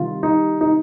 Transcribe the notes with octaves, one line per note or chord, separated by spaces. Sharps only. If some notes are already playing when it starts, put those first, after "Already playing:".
Already playing: C2 C3 D#3 F4
D#4
D#4